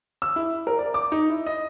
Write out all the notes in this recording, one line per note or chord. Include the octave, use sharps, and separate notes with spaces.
E6
E4
A#4
D5
D6
D#4
E4
D#5